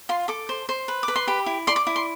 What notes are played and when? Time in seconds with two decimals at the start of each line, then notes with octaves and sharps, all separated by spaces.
0.09 F4 C6
0.28 A4 D6
0.49 C5
0.69 C5
0.88 B4
1.03 D6
1.08 B4
1.16 C6
1.27 G4 B5
1.46 E4
1.67 D5 C6
1.76 D6
1.87 E4
1.96 C6